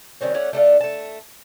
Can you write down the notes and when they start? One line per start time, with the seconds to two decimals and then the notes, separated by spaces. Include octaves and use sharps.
0.21 D#3 G3 C4 C#4
0.34 A3 C#4 D5 F#5
0.53 A3 D4 A4 F5
0.81 A3 A5